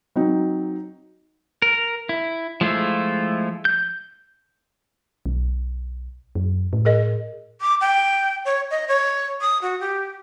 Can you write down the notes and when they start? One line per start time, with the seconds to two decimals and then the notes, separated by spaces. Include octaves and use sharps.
0.16 F#3 C4 D#4
1.62 A#4
2.09 E4
2.61 F3 G#3 A3 E4 F4
3.65 G6
5.26 B1
6.35 F#2
6.73 A2
6.85 G#4 A#4 D#5
7.61 D6
7.81 G5
8.45 C#5
8.71 D#5
8.88 C#5
9.41 D#6
9.62 F#4
9.80 G4